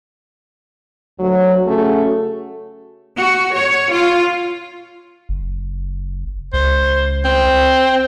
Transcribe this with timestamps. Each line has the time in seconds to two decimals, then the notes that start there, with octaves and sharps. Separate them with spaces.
1.20 D2 F#3
1.67 C#3 A3 C#4 F#4 G#4 A4
3.16 F#4
3.54 C#5
3.92 F4
5.29 F#1
6.53 C#2 C5
7.25 C4